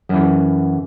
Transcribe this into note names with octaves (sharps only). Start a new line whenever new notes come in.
F#2 E3